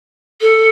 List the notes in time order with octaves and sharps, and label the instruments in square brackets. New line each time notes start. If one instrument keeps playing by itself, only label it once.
[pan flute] A4